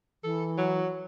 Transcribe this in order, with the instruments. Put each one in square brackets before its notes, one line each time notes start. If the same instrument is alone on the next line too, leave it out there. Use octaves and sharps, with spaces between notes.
[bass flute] E3 [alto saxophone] A4
[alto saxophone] F#3